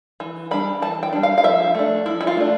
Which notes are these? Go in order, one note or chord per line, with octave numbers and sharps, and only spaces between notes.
E3
G3 D4 B5
E3 A5
G5
G3 D4
F5
F5
F3 E5
A3 D4
F3 E4
E4
F4
A3 D4